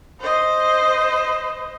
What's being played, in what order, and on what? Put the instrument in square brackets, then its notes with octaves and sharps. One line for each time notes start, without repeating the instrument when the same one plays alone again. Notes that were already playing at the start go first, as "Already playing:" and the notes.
[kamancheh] C5 D#5